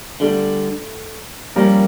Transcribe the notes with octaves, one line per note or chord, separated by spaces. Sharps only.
D3 G3 A3 D4
F3 G3 A#3 C#4 F4 A#4